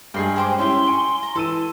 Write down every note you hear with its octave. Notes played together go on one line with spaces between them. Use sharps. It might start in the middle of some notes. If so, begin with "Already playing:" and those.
G2 G#3 G#4 G5 C7
G#4 C5 G5 D6
C#4 E4 G4 G5 C6
G#5 C#6 D7 G7
A#5
E3 A4 E6 D#7